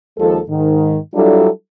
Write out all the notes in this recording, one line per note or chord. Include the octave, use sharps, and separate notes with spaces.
D#2 F3 G#3 A4
G#2 D#3
F#3 G3 D4 E4 F4 A4